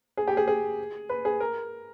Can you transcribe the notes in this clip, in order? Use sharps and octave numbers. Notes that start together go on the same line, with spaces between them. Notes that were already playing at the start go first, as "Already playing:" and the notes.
G#4
G4
G#4
G#4
B4
G#4
A#4